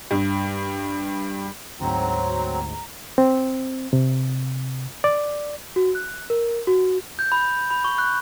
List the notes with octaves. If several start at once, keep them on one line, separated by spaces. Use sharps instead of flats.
G2
D2 G#2 F#3 C4 A#5
C4
C3
D5
F#4
F#6
A#4
F#4
G6
B5
B5
C#6
F#6